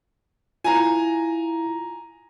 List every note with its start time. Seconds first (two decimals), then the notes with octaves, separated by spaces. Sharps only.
0.64 E4 F4 G#5 A#5